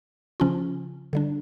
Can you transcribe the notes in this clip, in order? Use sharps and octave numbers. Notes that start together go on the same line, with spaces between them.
C#3 F3 C#4 F4
D3 G3 D4